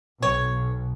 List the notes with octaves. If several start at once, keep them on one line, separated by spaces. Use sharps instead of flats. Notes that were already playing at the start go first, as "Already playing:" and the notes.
B1 C#5